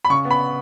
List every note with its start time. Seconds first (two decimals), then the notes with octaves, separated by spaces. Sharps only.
0.05 B5
0.10 C#3 C#6
0.25 B3
0.31 B5